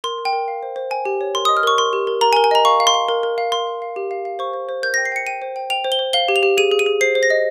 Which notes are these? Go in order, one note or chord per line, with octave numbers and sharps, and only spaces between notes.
A#4 C6
A#4
G5
A#4
F5
C5
C5
G5 G#5
G4
C#5
A#4 C6
D#6
D#5
F6
A#4 C#6
A#4 C6
G4
A#4
A#4 A#5
G#5
A#4
G#5
D#5 A#5
F5 C#6
F5
C6
F5
A#4
A#4
F5
A#4 C6
F5
F5
G4
F5
F5
C5 C#6
C5
C5
A#4 G6
A#6
G5
C7
G5 C#7
G5 D#7
C5
G5
G5 F7
C5
G7
C5
F5 G7
G4
F7
G4
G#4 D#7
G#4
D#7
G#4
C5 C7
C5
A#6
D#5